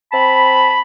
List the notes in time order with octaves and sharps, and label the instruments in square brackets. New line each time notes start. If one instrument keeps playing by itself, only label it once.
[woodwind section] C4 A5 B5